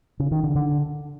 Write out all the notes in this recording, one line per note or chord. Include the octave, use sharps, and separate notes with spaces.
C#3
D#3
D3
D3